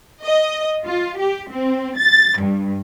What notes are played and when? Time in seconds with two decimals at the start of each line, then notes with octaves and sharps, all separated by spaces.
0.25 D#5
0.84 F4
1.19 G4
1.51 C4
1.98 A6
2.39 G2